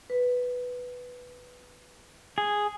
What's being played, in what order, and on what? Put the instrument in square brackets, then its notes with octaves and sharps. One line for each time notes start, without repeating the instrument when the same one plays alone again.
[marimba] B4
[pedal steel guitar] G#4